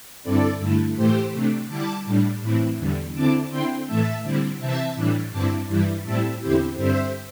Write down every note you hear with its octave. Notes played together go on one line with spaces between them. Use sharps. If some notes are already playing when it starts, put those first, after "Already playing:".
G2 D3 C4 E4 A4 D5
G2 D3 A3 E4
A2 E3 A3 G4 C5
C3 A3 D4
D3 G3 E4 A5 D6
A2 G3 D4
A2 E3 C4 E4
E2 D3 G3
D3 C4 E4 A5 D6
D3 C4 E4 G5 C6
A2 E3 A3 E5 A5
D3 G3 C4 E4
C3 E3 C4 E5 A5
A2 E3 G3 D4
G2 D3 C4 E4 A5 D6
G2 E3 G3 E4
A2 G3 C4 E4 E5 A5
E2 D3 C4 E4 G4 C5
G2 D3 G3 C4 C5 E5